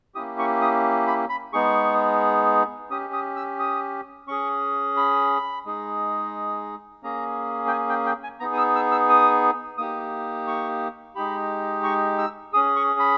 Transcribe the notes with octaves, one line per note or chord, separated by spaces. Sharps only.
A#3 C#4 E4 G4 D#6
C#6
D#6
B5
B5
G#3 B3 D#4 G#4 C#6
C#4 G4 D#6
D#6
E6
D#6
C#4 G#4 C#6
B5
G#3 D#4 G#4
A#3 C#4 G#4 A#5
G5
G#5
G5
G5
G#5
B3 D#4 G#4 A#5
D#6
E6
E6
E6
D#6
A#3 D#4 G4 D#6
C#6
G#3 D#4 G4 B5
C#6
E6
C#4 G#4 D#6
C#6
B5